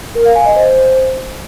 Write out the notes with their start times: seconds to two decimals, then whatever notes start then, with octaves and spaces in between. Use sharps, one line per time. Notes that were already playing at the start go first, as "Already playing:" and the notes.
0.15 A#4
0.25 F5
0.36 G#5
0.46 D#5
0.56 C5